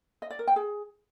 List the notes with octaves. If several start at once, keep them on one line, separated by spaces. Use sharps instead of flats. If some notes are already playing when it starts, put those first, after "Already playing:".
D#5
D5
A#4
G5
G#4